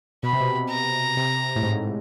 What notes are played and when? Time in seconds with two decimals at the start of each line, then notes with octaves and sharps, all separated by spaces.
0.23 B2 B5
0.33 C3
0.41 B2
0.70 A#5
1.17 C3
1.56 A2
1.63 G#2